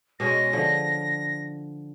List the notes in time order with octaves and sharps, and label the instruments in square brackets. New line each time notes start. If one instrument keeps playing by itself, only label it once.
[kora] B2 G#3 C#4 [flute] A#6
[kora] D3 F3